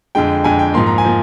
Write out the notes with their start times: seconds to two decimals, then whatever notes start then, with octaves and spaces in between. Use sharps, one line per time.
0.15 F2 D3 G#3 G5
0.44 F2 D3 G#3 G#5
0.59 G5
0.74 G#2 F3 A#3 C6
0.87 A#5
0.98 G#5
1.05 F3 A#3